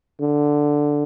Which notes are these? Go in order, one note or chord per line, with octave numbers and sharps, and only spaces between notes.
D3